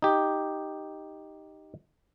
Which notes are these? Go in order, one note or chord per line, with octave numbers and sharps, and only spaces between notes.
D#4 G4